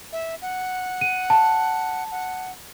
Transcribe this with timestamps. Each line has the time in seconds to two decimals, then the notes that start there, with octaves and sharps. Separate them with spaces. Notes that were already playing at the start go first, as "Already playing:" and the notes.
0.12 E5
0.42 F#5
1.01 D#7
1.30 A5
2.11 F#5